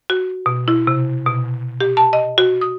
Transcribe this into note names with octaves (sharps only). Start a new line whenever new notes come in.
F#4
B2
E4
C3
B2
G4
A5
D#5
F#4
D#6